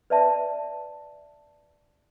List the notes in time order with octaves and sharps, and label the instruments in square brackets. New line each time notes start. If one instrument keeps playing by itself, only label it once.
[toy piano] B4 D5 E5 A5